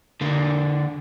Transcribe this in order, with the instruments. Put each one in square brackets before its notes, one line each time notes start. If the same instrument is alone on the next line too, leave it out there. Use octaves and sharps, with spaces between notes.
[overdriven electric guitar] D3 A#3